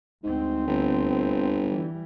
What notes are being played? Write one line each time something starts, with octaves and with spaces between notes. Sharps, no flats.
D2 G#2 C4
G1
E3 G3